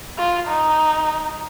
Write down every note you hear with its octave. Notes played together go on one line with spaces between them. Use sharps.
F4
D#4